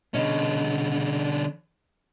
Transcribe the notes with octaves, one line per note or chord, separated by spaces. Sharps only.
B2 D3 G3 C#4 D#5